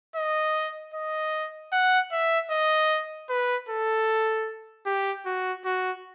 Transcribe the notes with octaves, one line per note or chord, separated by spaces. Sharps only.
D#5
D#5
F#5
E5
D#5
B4
A4
G4
F#4
F#4